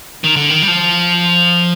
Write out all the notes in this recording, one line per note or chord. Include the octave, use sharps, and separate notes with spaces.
D#3
D3
D#3
G3
F3